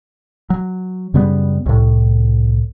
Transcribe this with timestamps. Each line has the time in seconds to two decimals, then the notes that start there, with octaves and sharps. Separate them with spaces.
0.50 F#3
1.14 F#2 C#3 G3 B3
1.66 C2 A2